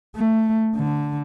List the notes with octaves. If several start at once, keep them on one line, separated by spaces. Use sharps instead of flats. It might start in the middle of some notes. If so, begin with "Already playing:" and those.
A3
D3